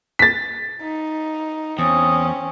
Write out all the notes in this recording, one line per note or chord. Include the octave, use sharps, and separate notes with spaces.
A6 B6
D#4
E2 C4 C#4 D#6